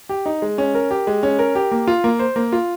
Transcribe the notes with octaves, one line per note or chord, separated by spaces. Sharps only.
G4
D#4
G#3
C#4
A#4
G4
G#3
C#4
A#4
G4
A#3
F4
A#3
C5
A#3
F4